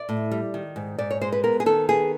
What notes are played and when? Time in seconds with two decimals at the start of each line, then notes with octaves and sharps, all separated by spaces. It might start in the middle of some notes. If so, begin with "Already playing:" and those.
Already playing: D5
0.09 A2
0.31 G3
0.54 D#3
0.76 G#2
0.98 G#2 D5
1.11 C#5
1.21 G#3 C5
1.32 B4
1.44 B3 A#4
1.60 G#4
1.66 D#3 A4
1.89 B3 G#4